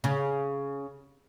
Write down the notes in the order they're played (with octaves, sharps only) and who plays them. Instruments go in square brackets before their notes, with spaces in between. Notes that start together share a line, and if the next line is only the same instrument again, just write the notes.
[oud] C#3